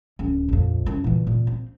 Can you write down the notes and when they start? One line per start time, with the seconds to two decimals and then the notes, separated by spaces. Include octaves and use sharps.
0.19 D1 C#4
0.49 A#1 F2
0.86 F#2 E4
1.04 A#2 E3
1.27 A#2
1.47 C4